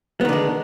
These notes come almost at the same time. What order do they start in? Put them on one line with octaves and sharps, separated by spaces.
B3 D#3 D3 G#3